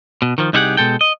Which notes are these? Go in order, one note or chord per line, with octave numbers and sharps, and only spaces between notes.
B2
D#3 F3
C2 D#4 E4 G4 G#4 F#5
B2 G#3 A4 G5
D#5